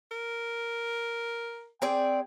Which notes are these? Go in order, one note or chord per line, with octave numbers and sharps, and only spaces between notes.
A#4
C4 G#4 D5 G5